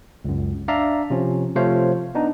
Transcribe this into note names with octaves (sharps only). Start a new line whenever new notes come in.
C#2 F#2
D4 D5 E5 F5 A#5
C3 F3 C#4
C3 F3 A3 C5 C#5 F5
B3 D4 D#4